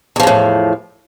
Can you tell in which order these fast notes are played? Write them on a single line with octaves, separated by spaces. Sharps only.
E2 F3 C#3 A2